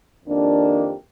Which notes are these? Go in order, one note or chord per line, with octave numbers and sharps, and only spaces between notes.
F2 D#3 A#3 D4 G4